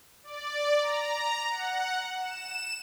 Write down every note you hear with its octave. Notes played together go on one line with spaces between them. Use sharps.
D5
A#5
F#5
E7